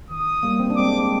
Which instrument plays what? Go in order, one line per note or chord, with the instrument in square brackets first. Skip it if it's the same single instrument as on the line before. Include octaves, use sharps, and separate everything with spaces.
[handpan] D#3 [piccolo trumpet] D#6
[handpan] G3 A#3
C4
D4
[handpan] G#3 C4 [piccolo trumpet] D6